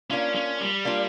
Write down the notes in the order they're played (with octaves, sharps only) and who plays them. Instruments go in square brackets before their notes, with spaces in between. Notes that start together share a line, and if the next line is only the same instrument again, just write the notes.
[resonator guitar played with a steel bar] A#3 D4 F4 [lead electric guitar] C#4
[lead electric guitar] C#4
G3
[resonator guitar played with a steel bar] A#3 D4 F4